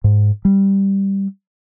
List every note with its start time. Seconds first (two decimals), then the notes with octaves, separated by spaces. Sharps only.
0.04 G#2
0.45 G3